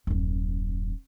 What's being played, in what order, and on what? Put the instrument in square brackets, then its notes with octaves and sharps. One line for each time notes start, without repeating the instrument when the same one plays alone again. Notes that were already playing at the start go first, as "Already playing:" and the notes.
[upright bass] D#1 F#2